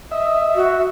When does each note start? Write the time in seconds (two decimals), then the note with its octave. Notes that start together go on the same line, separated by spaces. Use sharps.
0.12 D#5 E5
0.55 F#4